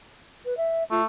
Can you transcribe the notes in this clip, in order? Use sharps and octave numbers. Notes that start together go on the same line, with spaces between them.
B4
E5
A3 F4